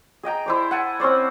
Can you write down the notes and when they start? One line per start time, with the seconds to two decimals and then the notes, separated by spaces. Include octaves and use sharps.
0.23 G#4 D#5 G5 A#5
0.46 E4 C5 D5
0.71 F#5 G#5 A5
1.00 C4 C#4 C5 D5